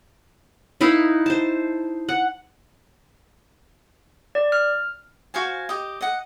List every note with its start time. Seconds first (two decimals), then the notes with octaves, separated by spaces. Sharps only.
0.81 D#4 E4 B4 F5
1.26 C5 A5
2.09 F#5
4.35 D5
4.52 F6
5.34 F#4 C5 F5 G#5
5.69 G4 D#5
6.01 D#5 F#5